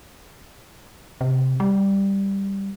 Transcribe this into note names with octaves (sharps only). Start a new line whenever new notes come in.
C3
G3